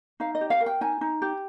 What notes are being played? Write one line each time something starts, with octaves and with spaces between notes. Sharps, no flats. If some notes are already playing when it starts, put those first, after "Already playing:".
D#4 F5
D#5
G4
F5
A#4
G5
D#4 G#5
D#4
G4